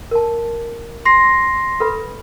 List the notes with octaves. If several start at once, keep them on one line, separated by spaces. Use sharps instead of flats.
A#4 A5
C6 A#6 C7
A4 B4 B5